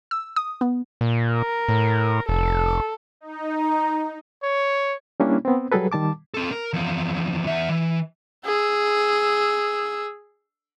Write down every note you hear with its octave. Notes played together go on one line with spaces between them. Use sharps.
E6
D#6
B3
A#2
A#4
A2
F1 A4
D#4
A#5
C#5
G3 A#3 C#4 D4 E4
B3 C4
F#3 G3 G#4 A4 B4
D#3 G3 A5 D6
C4 A4
A#4
E2 F3
E2 E5
E3
G#4 E6